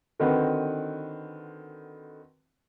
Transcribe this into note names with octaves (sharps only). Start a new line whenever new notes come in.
D3 D#3 C4 F#4 B4